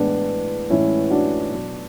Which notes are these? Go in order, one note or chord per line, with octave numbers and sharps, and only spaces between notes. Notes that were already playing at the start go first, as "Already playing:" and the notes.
Already playing: A2 E3 G#3 B3 D4
A2 E3 G#3 C#4 E4
D4 F#4
B2 F#3